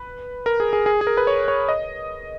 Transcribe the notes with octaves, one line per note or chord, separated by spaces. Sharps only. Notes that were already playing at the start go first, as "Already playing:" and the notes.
Already playing: B4
A#4
G#4
G#4
G#4
G#4
A#4
B4
C#5
C#5
D#5